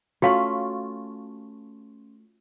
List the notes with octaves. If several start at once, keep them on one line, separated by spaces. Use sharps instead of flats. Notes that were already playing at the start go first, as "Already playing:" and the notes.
A3 C#4 F4 F#4 F5 C6